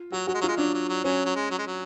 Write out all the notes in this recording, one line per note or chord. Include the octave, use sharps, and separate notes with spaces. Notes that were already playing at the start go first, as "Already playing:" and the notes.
Already playing: F4
F#3 F#4
F#3 F#4
G#3
F#3 F4
G#3
F#3 D4
F#3
F#3
F#3 C#4
F#3
G#3
F#3
G#3
F#3